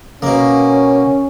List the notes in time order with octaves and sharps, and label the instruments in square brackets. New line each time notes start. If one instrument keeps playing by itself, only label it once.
[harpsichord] B2 A#3 [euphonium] C#4